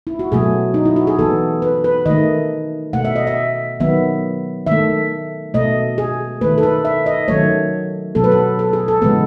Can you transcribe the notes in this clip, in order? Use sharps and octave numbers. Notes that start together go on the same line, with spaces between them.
E4
F#4
B2 F#3 A3 G#4
D#4
E4
F#4
G#4
E3 B3 A4
B4
B4
D#3 A3 D#5
B2 A3 F#5
E5
D#5
E5
D#3 F#3 B3 E5
D#3 A3 E5
B2 A3 D#5
G#4
D#3 A3 B4
A4
B4
E5
D#5
D#3 F#3 A3 C#5
B2 F#3 B3 A4
B4
A4
A4
G#4
A4
C#3 E3 G#3 B3 B4